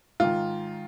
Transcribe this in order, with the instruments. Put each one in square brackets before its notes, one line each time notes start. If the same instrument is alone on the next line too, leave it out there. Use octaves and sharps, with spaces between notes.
[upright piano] G#2 D#3 F4